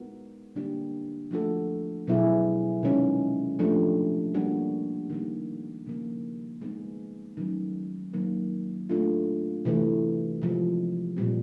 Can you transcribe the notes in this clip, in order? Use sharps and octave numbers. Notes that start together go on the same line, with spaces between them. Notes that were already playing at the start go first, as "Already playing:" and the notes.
Already playing: G#3 B3 D#4 F#4 A#4
D3 G3 A#3 D4 G4
F3 A3 D4 F#4 A4
B2 F#3 B3 E4 G#4
C3 D#3 G#3 C#4
F3 A3 D4 G4
G3 A#3 D4 F#4
D#3 G3 A#3
C#3 F3 A#3
G#3 B3 D#4 G#4
D#3 F#3 A3 C#4 F#4
D#3 F#3 A#3
A3 D4 F4
C3 E3 A3
C3 F3 G#3
A#2 G3 C4